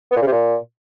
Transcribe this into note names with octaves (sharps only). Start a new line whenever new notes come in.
B3
A#2
C#3
C3
A#2